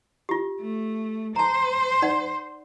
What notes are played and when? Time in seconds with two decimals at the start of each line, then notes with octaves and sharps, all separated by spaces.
0.29 F4 G4
0.60 A3
1.36 C5 A5 A#5
2.02 D#4 D5 F#5